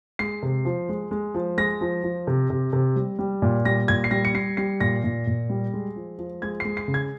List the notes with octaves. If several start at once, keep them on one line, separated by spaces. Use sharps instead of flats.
G#3 C7
C3
F3
G#3
G#3
F3
G#3 A#6
F3
F3
C3
C3
C3
G3
G3
A#2
G3 A#6
A#2 G#6
C7
G3 A#6
C#7
G3 C7
G3 C7
A#2 A#6
A#2
A#2
G3
G#3
F3
F3
G#3 G#6
G#3 C7
C7
C#3
G#6